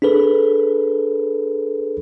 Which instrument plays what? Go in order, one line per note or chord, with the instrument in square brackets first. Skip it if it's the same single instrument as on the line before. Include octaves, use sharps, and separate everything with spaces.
[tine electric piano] D4 G#4 A4 B4